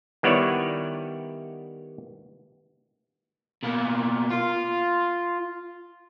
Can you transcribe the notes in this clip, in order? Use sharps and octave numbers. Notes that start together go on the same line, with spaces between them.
D#3 G3 B3 E4 C#5 D5
B2 A#3
F4